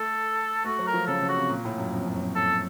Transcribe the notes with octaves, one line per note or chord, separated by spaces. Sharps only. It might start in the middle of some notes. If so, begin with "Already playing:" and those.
Already playing: A3 A4
A3 F#4
F#3
A#4
F3
C#3 A4
C#3
F#4
C3
A#2
A2
F#2
F2
F#2
F2
A4